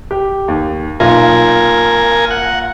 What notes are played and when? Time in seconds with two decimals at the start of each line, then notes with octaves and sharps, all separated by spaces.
0.11 G4
0.48 D#2
1.00 B1 A#2 F4 A#4 G#5
2.31 F#5